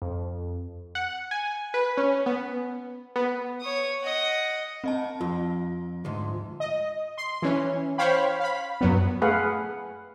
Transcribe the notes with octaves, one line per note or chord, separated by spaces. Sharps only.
F2
F#5
G#5
B4
C#4
B3
B3
C#5 D#6
D#5 F#5
C4 D#5 A5
F2 F4
D2 G#2
D#5
C6
E3 C#4
C5 C#5 F5 G5 B5
F5 B5
F#2 F#3 B3
A3 G#4 B4 F5 F#5